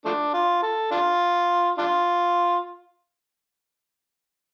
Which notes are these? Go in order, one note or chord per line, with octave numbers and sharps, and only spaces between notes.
F3 A3 D4
F4
A4
D4 F4
D4 F4